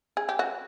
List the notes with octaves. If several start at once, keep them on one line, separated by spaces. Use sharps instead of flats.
G#4
G4
F#4